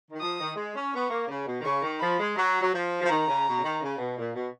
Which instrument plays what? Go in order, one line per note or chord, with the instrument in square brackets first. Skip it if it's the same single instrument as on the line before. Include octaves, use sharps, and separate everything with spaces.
[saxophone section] D#3
[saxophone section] F3 [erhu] D#6
[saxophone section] D#3
G#3
C#4
[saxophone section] B3 [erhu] C#6
[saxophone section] A#3
C#3
B2
D#3
[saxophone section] C#3 [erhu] C#6
[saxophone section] D#3
[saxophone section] F3 [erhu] B5
[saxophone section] G#3
[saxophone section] F#3 [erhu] A#5
[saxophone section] F#3
F3
F3
[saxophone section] D#3 [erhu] A#5
[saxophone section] C#3
B2
C#3
D#3
C#3
B2
A#2
B2